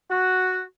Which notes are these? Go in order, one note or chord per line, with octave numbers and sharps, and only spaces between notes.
F#4